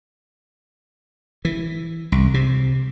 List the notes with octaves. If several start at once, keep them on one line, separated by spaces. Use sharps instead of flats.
E3
C2
C3